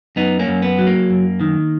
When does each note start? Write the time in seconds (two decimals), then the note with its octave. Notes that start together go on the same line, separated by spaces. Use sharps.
0.16 F#2 B3 D#4
0.39 A#3 C#4
0.48 F#2
0.62 B3
0.79 F#3
0.87 A#3
1.10 F#2
1.40 D#3